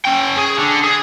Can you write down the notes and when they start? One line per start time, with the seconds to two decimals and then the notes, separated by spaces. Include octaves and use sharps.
0.05 C#4 G5
0.38 G#4
0.59 D3
0.84 G#4